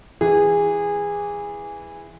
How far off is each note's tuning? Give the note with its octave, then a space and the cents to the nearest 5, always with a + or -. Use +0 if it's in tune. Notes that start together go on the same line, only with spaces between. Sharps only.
E3 +0 G#4 -20